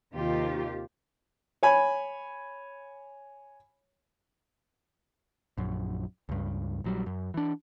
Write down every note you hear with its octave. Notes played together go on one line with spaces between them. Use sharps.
D#2 C3 D#3 F4 G4
C#5 G#5 B5
A#1 F#2
C#2 G2
A#1 F#3 G3
F#2
E3 D4